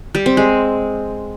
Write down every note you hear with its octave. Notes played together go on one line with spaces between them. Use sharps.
G3
C4
G#3